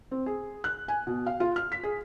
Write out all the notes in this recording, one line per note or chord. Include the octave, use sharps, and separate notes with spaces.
C4
G#4
F#6
G#5
B2
F5
F4
F6
B6
G#4